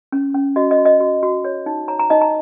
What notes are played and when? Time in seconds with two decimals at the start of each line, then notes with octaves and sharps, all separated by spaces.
0.12 C#4
0.34 C#4
0.56 F#4 D#5
0.71 D#5
0.78 F#4
0.85 D#5
1.00 F#4
1.23 F#4
1.45 C#5
1.66 D#4
1.88 C#5 A#5
1.99 A#5
2.10 D#4 D#5
2.22 A#5